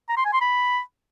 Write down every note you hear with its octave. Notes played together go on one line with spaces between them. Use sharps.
A#5
C6
G#5
C6
B5